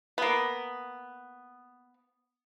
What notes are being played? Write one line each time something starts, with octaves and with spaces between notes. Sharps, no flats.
A#3 B3